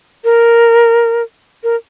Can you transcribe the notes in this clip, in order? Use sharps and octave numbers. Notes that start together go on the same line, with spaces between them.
A#4
A#4